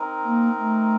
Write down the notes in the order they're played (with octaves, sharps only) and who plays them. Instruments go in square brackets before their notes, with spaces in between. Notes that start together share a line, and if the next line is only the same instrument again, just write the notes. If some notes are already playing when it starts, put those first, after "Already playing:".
Already playing: [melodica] C4 D#4 A#4
[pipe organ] A#3
A3